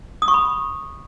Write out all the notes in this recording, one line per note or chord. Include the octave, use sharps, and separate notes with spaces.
D#6
C#6
B5